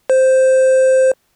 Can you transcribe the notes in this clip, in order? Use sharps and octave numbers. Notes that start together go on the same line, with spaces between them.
C5